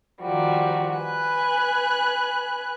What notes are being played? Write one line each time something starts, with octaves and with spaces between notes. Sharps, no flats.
D#3 F3 G3 F#4
B4 G#5 F#6